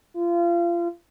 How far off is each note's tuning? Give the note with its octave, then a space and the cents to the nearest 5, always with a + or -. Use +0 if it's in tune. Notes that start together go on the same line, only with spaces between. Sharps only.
F4 -30